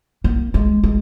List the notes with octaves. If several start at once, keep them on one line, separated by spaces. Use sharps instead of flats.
A#3
G#3
G#3